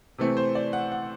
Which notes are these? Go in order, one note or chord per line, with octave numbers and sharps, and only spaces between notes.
C3 E3 A3 C4
C5
D5
F#5
F#5